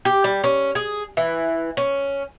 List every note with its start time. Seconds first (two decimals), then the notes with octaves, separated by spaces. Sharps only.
0.05 G4
0.24 G3
0.44 C#4
0.75 G#4
1.17 E3
1.77 C#4